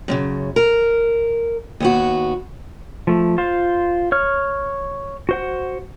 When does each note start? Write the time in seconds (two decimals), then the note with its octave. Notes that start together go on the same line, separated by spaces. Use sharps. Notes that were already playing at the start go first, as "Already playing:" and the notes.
0.08 F#2 A2 C#3
0.56 A#4
1.80 D#2 B3 F#4
3.07 F3 A3
3.38 F4 C5
4.12 C#5 F6
5.29 F#4 C5 F#5